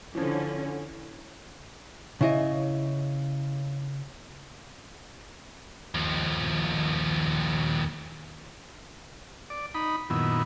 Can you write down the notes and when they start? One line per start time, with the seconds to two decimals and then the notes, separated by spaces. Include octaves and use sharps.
0.15 D3 E3 F3 C#4
2.21 C#3 E4 D#5
5.95 D#2 F3
9.50 D5
9.75 D#4 B5
10.10 F#2 A#2 D#3 B3 E4